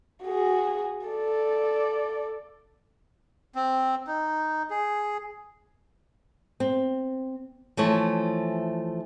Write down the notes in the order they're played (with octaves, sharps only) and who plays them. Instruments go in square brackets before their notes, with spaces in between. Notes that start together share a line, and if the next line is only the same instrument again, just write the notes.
[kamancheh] F#4 G#4
A4 D5
[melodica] C4
D#4
G#4
[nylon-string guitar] C4
E3 F3 A3 C#5